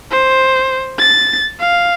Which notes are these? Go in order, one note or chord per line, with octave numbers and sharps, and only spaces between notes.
C5
A6
F5